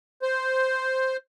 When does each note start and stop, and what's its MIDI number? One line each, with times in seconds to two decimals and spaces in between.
0.22 1.17 72